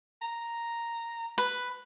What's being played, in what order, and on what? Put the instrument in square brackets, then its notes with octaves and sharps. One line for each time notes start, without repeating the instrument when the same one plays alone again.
[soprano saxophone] A#5
[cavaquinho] B4